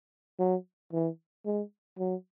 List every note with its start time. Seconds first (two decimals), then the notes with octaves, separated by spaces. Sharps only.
0.39 F#3
0.92 E3
1.46 G#3
1.99 F#3